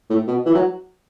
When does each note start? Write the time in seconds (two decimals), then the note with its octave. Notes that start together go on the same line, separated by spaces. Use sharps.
0.10 A2
0.27 B2
0.46 E3
0.55 F#3